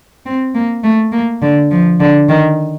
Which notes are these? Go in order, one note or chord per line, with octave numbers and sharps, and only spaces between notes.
C4
A#3
A3
A#3
D3
F3
D3
D#3